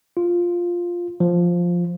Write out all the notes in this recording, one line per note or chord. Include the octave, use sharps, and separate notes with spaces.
F4
F3